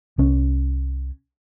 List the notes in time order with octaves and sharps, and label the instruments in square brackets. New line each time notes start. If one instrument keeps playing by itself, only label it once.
[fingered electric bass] C2 C#4